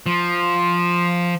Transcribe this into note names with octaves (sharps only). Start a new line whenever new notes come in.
F3